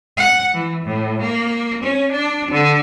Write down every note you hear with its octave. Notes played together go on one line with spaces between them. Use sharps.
F#5
E3
A2
A#3
C#4
D4
D3